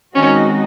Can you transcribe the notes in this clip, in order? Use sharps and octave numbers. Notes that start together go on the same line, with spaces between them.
D#3 G#3 C4 C#4 D#4 F#4